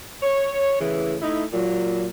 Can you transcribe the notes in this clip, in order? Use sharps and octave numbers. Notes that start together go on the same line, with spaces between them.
C#5
A2 C#3 E3
A3 D#4 E4
A#2 F#3